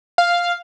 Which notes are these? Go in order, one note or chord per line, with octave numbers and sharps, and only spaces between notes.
F5